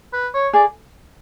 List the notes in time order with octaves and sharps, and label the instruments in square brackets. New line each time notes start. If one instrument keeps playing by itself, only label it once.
[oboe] B4
C#5
[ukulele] G#4 [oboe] D5